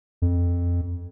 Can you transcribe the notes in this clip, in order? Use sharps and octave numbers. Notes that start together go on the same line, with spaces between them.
F2